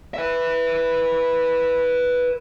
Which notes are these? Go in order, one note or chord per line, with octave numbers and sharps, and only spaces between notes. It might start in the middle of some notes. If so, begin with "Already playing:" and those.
B4 E5